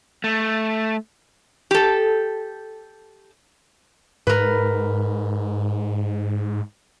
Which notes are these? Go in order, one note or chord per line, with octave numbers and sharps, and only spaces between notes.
A3
G4 A4
G#2 A#4 B4